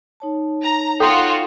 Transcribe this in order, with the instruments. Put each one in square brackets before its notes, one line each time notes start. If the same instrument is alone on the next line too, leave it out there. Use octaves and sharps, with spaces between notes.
[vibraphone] D#4 C#5 A5
[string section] A#5
[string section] F4 F#4 [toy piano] A4 [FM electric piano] G5 C6